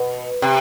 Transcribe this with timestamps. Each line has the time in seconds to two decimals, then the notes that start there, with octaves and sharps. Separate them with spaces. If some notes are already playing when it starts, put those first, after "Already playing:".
Already playing: B2
0.42 C3